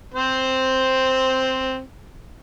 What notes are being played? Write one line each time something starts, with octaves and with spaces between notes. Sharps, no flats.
C4 C5